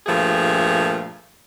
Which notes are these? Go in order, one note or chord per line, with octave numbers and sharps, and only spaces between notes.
G2 A#2 F3 A3 G#4